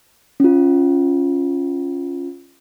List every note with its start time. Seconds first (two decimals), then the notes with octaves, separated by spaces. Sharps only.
0.40 C#4 F4